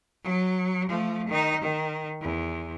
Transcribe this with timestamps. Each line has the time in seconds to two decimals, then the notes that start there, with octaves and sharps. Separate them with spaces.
0.23 F#3
0.89 F3 A3
1.28 D#3 D#4
1.61 D#3
2.21 E2